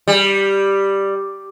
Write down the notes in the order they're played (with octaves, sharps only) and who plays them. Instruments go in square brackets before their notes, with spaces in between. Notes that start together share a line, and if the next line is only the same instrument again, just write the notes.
[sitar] G3